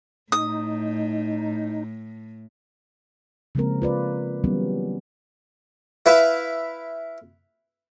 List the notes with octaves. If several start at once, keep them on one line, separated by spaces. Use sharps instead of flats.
A2 D#4 D#6
C#3 F3 G#3 A#3 C4 A#4
F4 B4 D5
E3 F#3 G3 B3 C#4
E4 B4 E5 F5